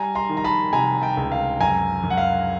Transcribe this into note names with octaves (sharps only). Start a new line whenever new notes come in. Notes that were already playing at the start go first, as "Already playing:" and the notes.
Already playing: G3 G#5 A#5
A#5 C6
D#3
A#5
A5 B5
C3 G#5 A#5
G5 A5
C#2
F5
F#2 G#5 A#5
F#2
F#5
F5